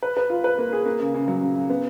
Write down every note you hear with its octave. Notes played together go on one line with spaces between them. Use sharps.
B4
B4
F4
B4
A#3
G#4
A#3
C#3
C#3
F#3
C#3
C#3
B3